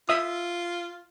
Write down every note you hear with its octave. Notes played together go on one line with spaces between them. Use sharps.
F4 E5 D#6